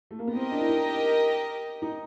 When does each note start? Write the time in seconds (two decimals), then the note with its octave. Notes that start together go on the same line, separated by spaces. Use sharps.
0.11 A3
0.19 A#3
0.27 B3
0.35 C4 G4 A#4 D#5
0.52 D4
0.60 E4
0.69 D#4
1.82 D#4